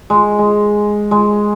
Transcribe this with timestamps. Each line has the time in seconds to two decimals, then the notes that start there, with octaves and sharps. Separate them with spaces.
0.10 G#3
0.39 G#3
1.11 G#3